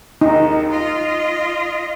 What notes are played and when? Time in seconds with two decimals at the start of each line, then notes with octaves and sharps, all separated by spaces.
0.21 D#2 D#4
0.71 F4 D#5